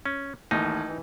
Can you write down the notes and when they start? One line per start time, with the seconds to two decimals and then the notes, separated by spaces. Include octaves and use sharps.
0.06 C#4
0.51 A1 D#2 D#4
0.88 E3